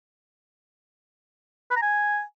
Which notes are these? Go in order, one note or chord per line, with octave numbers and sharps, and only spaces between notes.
B4
A#5
G#5